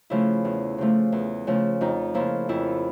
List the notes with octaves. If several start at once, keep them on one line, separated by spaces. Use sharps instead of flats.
C#3 F3 A3 E4
E2
C#3 F3 A3
E2
C#3 F3 A3
F2 D#4
C#3 F3 A#3 E4
F2 E4